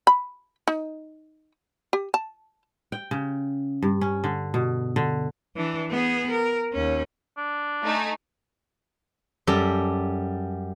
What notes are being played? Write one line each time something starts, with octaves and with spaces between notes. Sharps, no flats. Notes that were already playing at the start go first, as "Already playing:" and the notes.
B5
D#4
G4
A5
G5
C#3
G2
C#4
D3
B2
D3
E3 D4
B3 G#4
A#4
D#2 C#4
D4
A3 D#4 G#5
F#2 G3 G4 A4